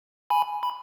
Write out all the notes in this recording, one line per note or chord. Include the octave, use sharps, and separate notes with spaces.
G#5 B5
B5